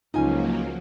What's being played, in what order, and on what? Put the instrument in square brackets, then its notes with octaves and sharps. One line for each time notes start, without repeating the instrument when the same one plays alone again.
[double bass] C#2 C#4 [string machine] F3 F#3 A#3 [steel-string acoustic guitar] D#4 F4 G#5